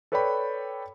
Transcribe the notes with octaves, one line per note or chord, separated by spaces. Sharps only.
A4 B4 C#5 D5 G5 B5